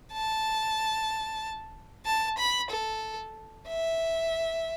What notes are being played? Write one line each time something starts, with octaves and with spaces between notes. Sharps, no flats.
A5
A5
B5
A4
E5